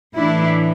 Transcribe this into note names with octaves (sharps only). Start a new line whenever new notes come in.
A2 E3 D4 E4